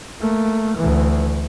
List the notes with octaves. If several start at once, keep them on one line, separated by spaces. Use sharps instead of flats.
A3 A#3
D2 E3